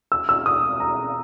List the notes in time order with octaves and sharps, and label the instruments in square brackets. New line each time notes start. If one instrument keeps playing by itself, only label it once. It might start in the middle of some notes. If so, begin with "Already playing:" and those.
[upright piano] E6
E6
D#6
A#5